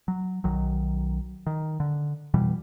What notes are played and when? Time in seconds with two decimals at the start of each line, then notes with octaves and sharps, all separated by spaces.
0.08 F#3
0.44 B1 D#3 F#3
1.47 D#3
1.80 D3
2.34 F2 B2 E3 G3